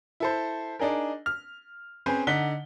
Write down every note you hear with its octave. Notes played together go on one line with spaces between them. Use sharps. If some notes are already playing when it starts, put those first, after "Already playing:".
E4 A4 C5
D4 D#4 G#4 A#4
F6
C4 C#4 G#4 B4 C5 G#5
D3 D#4 F#5 B6 G7